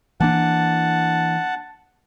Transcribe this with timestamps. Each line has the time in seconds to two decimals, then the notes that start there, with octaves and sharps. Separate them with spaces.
0.20 E3 A#3 D4 F#5 A5